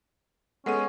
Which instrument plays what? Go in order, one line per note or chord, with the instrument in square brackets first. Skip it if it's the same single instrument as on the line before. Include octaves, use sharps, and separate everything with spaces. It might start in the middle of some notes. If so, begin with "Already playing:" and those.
[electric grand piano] G#3 B3 D#7 [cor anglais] C#4 [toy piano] A4 F#5